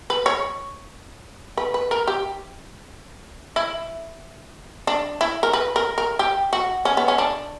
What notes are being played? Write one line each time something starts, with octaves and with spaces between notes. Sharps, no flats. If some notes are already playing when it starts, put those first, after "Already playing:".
B4
C#5
B4
B4
A#4
G4
E4
D4
E4
A#4
B4
A#4
A#4
G4
F#4
C#4
B3
C#4
D4